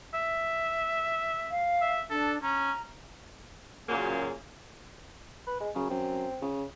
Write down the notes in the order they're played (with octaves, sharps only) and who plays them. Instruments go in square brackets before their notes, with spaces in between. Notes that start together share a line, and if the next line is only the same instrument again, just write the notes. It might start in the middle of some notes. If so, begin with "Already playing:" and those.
[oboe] E5
[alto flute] F5
[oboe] E5
[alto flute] D4 [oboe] A4
[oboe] C#4 [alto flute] A#5
[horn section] F#2 A#2 C#3 F#3 A#3 G#4
[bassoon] B4
G#3
[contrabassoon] F#2 [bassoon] C#3
[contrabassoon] F#2 [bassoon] C4
[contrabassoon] C#3